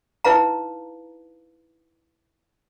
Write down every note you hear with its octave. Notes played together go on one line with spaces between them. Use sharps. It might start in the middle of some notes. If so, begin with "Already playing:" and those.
D#4 E4 B4 F5 A#5